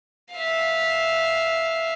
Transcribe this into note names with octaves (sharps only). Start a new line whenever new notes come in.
E5 F5